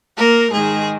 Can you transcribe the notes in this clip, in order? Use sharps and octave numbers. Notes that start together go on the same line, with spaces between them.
A#3 A#4
G#2 D#3 G#4